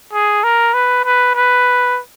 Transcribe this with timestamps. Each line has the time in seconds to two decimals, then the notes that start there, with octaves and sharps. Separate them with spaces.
0.13 G#4
0.44 A#4
0.74 B4
1.05 B4
1.36 B4